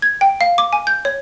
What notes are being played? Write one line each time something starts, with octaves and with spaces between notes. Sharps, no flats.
G#6
G5
F5
D6
G#5
G6
C#5